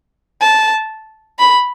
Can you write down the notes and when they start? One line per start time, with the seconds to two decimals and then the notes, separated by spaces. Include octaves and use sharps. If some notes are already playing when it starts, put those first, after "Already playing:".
0.41 A5
1.39 B5